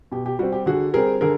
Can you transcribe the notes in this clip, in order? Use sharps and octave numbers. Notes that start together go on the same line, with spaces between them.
B2 G4
G4
G3 C4 F#4
G4
D3 F#4 G#4
G3 C4 G#4 A#4
D3 G#4 A#4